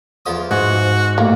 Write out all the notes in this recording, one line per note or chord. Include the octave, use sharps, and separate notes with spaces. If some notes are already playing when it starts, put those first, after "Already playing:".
E2 F3 D#6
G#2 F#4
A1 A#3